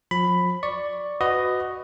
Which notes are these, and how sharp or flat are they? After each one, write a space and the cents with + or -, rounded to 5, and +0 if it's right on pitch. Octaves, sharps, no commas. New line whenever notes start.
F3 +35 B5 +10
D5 +0 C#6 +0
F#4 +0 B4 +20 D#5 +0